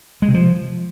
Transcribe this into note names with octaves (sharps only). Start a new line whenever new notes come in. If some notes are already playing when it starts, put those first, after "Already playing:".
G#3
C3
F3